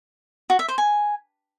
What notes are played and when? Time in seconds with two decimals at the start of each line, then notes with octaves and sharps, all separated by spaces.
0.50 F#4
0.59 E5
0.68 C5
0.78 G#5